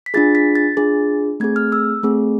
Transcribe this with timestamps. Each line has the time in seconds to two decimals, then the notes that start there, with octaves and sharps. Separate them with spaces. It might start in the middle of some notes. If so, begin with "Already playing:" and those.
0.06 B6
0.14 D4 F4 G#4 A6
0.35 B6
0.55 A6
0.77 D4 F4 G#4
1.40 A3 C4 G#4 G#6
1.56 F6
1.72 E6
2.03 A3 C4 G#4